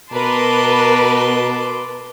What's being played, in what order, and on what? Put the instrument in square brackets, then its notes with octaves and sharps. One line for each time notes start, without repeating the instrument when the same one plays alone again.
[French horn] B2 [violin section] A#4 B4 [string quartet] A5 C6 D6